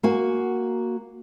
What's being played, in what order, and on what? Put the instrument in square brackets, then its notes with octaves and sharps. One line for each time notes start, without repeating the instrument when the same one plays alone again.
[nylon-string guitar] A#3 F#4 G#5